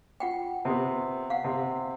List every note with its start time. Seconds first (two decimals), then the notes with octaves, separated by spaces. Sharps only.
0.20 F4 F#5 G5
0.65 C3 B3
1.30 F5 F#5
1.44 C3